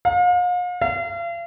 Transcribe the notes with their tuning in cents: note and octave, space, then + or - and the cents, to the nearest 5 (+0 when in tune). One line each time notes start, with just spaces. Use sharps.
F5 +40
F5 -40